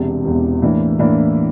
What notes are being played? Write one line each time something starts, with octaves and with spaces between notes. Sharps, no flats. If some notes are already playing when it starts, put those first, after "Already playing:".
Already playing: E1 E2 C3
E1 E2 C3
A2 E3 A#3 D4
A2 E3 A#3 D4